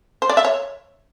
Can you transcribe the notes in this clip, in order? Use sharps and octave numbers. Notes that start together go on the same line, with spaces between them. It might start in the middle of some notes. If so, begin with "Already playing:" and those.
C5
D5
E5
C#5